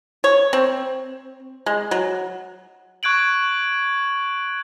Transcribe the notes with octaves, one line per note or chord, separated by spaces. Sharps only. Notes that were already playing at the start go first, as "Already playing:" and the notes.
C#5
C4
G#3
F#3
C#6 F#6 G#6 D7 F#7